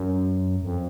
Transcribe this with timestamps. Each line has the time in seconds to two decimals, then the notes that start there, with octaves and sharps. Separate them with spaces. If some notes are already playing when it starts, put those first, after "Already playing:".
Already playing: F#2
0.63 F2